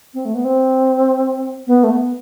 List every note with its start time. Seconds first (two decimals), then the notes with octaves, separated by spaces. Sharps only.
0.14 C4
0.25 A3
0.35 B3
0.45 C4
1.67 B3
1.84 A3
1.91 B3